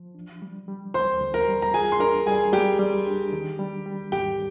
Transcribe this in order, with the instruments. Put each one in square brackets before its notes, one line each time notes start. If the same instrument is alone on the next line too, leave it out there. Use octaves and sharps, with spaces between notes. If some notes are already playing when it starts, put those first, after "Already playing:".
Already playing: [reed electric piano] F3
D4
G3
G3
[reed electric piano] D2 [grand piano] C5 C6
[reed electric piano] D2
[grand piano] A#4 A#5
[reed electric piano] G3
[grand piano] A#5
[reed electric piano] F4 [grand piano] G#4 G#5
[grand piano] C6
[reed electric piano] D4 [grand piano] A#4 A#5
[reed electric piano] G3 [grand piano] G#4 G#5
[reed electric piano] G3 [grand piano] G4 G5
[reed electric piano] G3
D4
D#3
G3
G3
[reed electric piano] G#2 [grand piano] G4 G5